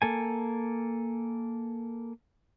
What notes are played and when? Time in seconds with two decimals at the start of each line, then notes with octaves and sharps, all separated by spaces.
0.02 A#3 A4 G#5